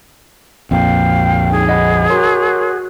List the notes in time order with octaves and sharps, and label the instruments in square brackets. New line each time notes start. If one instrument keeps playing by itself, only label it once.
[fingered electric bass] A#1 F2 [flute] F5 [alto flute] G5
[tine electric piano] D#4 [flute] G#4
[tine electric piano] D#5 F#5 B5
[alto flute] F#4 [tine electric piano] A#4 C#5 C6